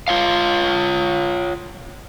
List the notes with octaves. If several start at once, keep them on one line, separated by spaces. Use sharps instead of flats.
F4 C#5 F5